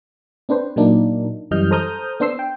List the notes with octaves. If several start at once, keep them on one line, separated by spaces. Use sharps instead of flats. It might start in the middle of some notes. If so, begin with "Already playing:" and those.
C4 D4 B4 C5
A#2 F#3 A#3 D4 D#4
F#2 E3 G3 D#5 F6 G6
A4 C5 A#5 D#6 F6 G6
B3 D4 C5 C6 E6 C7
G5